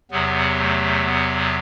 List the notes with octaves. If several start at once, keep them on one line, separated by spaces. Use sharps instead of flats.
E2 C3 F#3 B3
A3
B3